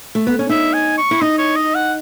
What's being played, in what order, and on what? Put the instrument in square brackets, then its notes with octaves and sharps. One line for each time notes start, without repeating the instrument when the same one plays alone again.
[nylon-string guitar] A3
B3
C#4
[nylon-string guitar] D#4 [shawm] E5
[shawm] G#5
C#6
[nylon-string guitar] E4
[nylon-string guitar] D#4 [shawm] D#5
[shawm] C#5
D#5
F#5